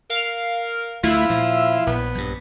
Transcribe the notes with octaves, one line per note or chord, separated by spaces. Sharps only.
A#4 F5
D2 A3 E4 F4 E6
A#2 F3
A#1 B3
A#1 G2